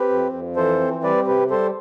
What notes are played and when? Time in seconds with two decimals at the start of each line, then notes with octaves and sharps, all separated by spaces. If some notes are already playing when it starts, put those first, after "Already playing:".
Already playing: C4 G4 B4
0.09 F2
0.32 F2
0.56 E3 A4 C5
0.80 C4
1.03 G3 B4 D5
1.27 C3 G4 B4
1.50 G3 A4 C5